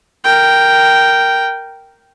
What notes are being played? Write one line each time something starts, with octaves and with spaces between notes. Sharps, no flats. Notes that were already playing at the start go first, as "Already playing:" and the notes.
A#4 G5